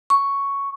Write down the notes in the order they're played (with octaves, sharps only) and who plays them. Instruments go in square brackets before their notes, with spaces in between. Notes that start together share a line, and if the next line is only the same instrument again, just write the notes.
[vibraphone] C#6